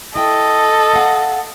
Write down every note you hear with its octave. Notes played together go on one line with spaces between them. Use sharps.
E4 A4 D#5 G5
F5 F#5